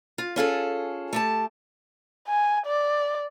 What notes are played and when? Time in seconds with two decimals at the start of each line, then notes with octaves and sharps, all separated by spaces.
0.18 F4
0.36 C#4 F4 G#4 A4
1.13 A3 G4 A5
2.28 G#5
2.66 D5